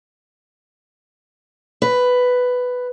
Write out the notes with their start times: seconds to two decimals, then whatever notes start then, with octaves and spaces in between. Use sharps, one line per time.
1.82 B4